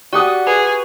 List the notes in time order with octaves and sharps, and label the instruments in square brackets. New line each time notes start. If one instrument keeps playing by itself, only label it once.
[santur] F#4 G4 D#6 [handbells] D5 F#5 F#6
[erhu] G#4 [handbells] B4